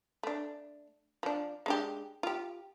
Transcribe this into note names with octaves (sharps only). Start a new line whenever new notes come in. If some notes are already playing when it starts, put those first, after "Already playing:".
A3 D4
F3 D4
G#3 D4 G4
F4 G4